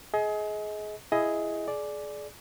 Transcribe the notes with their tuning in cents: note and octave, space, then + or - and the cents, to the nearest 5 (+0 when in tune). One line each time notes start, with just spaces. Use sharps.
G#4 +25 D#5 +30
E4 +15 G#4 +0 D#5 +15
G#4 +30 D5 +0